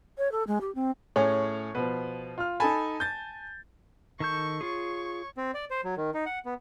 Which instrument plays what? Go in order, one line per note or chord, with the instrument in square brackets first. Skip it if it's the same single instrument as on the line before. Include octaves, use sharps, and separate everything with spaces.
[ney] C#5
A4
G#3
G4
C4
[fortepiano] A2 C#4 G#4 [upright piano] C#5
[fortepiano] B2 F3 [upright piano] B4
[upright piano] F4 F6
[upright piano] D#4 A4 B5 [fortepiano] G#5 A5
[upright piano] G6 A6
[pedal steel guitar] D#3 A4 G6 [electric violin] C#6
[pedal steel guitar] F4 G#4 [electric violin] C#5 C#6
[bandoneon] C4
D5
C5
F#3
D#3
D#4
F#5
B3